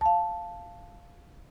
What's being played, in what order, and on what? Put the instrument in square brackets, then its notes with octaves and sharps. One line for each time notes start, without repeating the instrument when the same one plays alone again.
[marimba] F5 A5